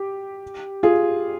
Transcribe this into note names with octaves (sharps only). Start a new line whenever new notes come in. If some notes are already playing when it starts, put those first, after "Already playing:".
Already playing: G4
F4 G#4